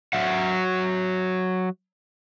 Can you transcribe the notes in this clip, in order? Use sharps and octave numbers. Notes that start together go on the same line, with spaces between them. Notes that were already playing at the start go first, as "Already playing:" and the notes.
F#3 E5 F#5